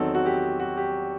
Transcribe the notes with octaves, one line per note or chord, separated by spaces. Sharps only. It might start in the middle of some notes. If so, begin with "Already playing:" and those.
Already playing: E2 D#3 F#3 C4 D#4 A4
F#4
G4
F#4
G4